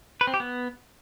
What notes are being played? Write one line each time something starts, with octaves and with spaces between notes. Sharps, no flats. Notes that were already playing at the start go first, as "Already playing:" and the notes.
B4
C4
G4
B3